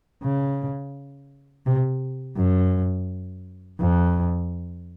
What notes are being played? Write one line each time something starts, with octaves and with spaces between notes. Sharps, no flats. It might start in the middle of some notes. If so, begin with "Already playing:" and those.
C#3
C3
F#2
F2